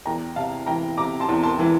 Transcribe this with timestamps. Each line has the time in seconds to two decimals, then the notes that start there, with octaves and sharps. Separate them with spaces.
0.05 E2 G5 A#5
0.36 C3 F5 A5
0.66 E3 G5 A#5
0.98 C3 A#5 D6
1.20 A5 C6
1.29 E2
1.43 A5 C6
1.59 E3